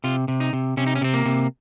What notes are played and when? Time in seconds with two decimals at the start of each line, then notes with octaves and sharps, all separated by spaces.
0.04 C3 F4
0.28 C3
0.40 D#4
0.53 C3
0.77 C3 C#4
0.86 D#4
0.95 C#4
1.02 C3 C4
1.14 A#3
1.26 C3